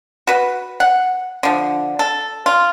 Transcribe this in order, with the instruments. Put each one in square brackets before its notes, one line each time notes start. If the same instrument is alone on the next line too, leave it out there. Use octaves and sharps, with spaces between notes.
[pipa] F#4 B4
F#5
D3 F3
A4
F4